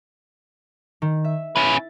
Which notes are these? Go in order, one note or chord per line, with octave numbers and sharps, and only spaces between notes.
D#3
E5
C#4 E4 B4 A6